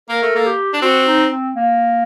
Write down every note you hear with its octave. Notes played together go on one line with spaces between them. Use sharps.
A#3 A#4
A3
A#3 A4
G4
D4
C4 F#4
D#4
C4
A#3